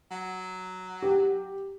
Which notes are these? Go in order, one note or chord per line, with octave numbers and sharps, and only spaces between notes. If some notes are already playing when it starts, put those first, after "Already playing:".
F#3
G4